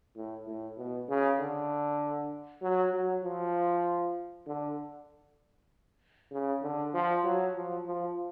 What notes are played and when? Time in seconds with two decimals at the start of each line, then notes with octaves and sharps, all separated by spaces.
0.16 A2
0.47 A2
0.78 B2
1.09 C#3
1.40 D3
2.62 F#3
2.94 F#3
3.24 F3
4.47 D3
6.32 C#3
6.62 D3
6.94 F3
7.24 F#3
7.56 F3
7.86 F3